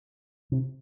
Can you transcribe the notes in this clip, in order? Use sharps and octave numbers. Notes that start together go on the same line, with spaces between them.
C3